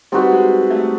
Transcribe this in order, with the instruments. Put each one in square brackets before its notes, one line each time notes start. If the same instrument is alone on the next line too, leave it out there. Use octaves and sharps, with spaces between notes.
[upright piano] G3 [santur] C4 D#4 F#4 B4
[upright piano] G#3
A3